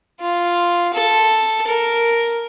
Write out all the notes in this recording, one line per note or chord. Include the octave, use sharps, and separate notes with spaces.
F4
A4
A#4